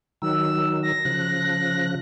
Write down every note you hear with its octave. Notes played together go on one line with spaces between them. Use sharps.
D#3 F#3 E6
A#6
C#3 F3 F#6